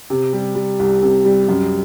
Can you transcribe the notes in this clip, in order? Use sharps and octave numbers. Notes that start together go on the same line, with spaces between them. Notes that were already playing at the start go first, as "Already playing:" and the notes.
C3
G3
G3
C2
C3
G3
F#2